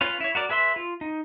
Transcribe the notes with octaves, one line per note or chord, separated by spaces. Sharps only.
C#4 F4 B4 C#5 F5
E4 C#5
F#4 A#4 D5
G#4 B4 E5 B5 C6
F4
D#4